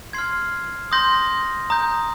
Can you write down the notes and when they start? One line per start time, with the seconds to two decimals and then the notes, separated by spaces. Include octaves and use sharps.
0.13 C6 F6 G#6 C7
0.92 C6 D#6 G6 A#6
1.70 A#5 D#6 G6